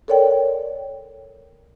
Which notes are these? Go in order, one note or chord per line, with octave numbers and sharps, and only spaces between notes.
A4 A#4 C#5 D5 G5